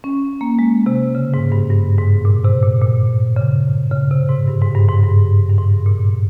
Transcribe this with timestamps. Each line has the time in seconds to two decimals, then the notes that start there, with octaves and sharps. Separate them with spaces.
0.04 C#4
0.41 A#3
0.59 G#3
0.86 C3
1.15 C#3
1.34 G#2
1.52 G2
1.70 G2
1.98 G#2
2.25 A#2
2.45 C3
2.63 A#2
2.82 A#2
3.36 C#3
3.92 C#3
4.11 C3
4.29 G#2
4.47 G2
4.61 G#2
4.75 G2
4.89 G#2
5.03 G2
5.49 G2
5.58 G#2
5.86 A#2